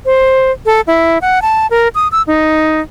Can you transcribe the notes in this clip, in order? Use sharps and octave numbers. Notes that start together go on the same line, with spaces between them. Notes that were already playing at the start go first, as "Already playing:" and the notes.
C5
A4
E4
F#5
A5
A#4
D#6
E6
D#4